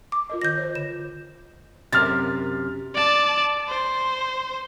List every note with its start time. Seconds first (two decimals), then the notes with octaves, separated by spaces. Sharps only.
0.12 D6
0.30 F4 A#4 D#5
0.42 D#3 F4 G6 A#6
0.56 C5 C#5 D#5
0.75 D3 E7
1.92 F#2 C3 F6 A6
2.95 D5 A5
3.68 C5